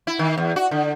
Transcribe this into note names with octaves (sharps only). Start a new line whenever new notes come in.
E4
D#3
E2
F#4
D3